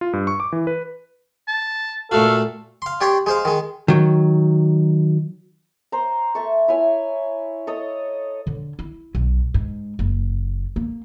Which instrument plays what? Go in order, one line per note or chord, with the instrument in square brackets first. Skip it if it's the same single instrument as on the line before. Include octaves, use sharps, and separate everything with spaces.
[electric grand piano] F4
G2
C#6
D6
E3
B4
[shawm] A5
[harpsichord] A#2 A3 F#4 [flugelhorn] A4 [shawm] F5
[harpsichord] F5 C6
D4 G4 C#5 D5 G5 C6
G#3 C5 F5
D#3 G#3
[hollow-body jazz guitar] D#3 F#3
[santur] C5 A#5
A3 A5 C#6
E4 C#5 G#5
A4 C#5 D#5
[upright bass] D3
E4
B1
G#2
F#1
A#3